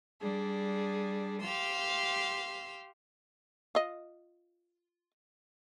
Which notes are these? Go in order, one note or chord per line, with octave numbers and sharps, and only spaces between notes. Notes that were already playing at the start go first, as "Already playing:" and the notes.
G3 D4 G#4
G4 F5 C6 E6
F4 D#5